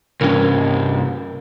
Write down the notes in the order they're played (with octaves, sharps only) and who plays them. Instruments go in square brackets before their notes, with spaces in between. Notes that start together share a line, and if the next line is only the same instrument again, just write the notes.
[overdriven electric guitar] C2 G2 [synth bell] C#4 A#4